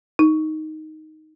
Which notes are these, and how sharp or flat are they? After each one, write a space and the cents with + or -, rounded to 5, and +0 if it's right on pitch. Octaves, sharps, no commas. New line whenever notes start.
D#4 +5